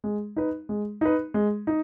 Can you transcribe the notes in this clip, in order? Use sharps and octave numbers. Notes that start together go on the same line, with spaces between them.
G#3
D#4 B4
G#3
D#4 B4
G#3
D#4